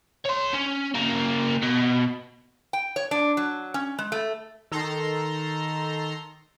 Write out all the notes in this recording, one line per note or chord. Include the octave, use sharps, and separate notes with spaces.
C#5 C6
C#4
C#3 A#3
B2
G5
C#5
D4
F#3
C#4
G#3
A3
D#3 A4 A#5 C6